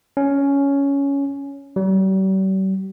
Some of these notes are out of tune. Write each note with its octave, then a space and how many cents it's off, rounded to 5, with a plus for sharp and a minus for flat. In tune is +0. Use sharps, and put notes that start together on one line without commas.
C#4 +10
G3 -45